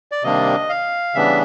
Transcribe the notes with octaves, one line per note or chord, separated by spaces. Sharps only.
D5
C3 D#3 G3 A#3 D4 D#5
F5
C#3 E3 G3 B3 D4 E5